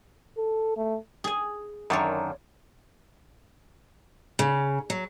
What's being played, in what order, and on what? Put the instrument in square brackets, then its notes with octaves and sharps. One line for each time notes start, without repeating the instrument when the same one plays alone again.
[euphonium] A4
A3
[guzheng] G#4 G#5
[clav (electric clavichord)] F#2 D3 D#3 [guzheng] C#5 D5 F5
[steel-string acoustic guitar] C#3
F#3